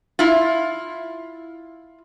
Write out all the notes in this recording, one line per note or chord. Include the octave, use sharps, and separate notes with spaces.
E4 F4